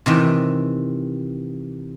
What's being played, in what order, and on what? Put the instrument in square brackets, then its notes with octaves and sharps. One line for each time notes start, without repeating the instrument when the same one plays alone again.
[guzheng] C3 D#3 E3